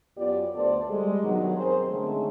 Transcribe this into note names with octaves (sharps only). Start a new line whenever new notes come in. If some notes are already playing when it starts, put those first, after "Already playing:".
F#2 B3 F4 G4 D5
D2 A3 B3 A4 C5 D5
G3 G#3
G2 B2 D#3 F#3
C4 G#4 A#4 C5
D3 D#3 G#3 A3 C4 C#4